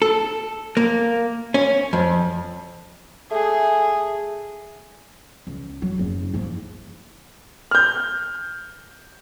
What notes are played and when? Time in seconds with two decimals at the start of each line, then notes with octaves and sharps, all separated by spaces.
0.02 A4
0.77 A#3
1.54 C#4
1.93 F2
3.31 A3 G#4
5.47 C#2
5.82 F#3
5.99 F#1
6.34 F3 A#3
7.71 F6 G6